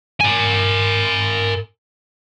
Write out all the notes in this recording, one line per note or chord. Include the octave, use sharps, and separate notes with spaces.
A#4 G#5